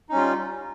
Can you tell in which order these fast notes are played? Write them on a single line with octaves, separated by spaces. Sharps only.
D#4 C#4 G3 F4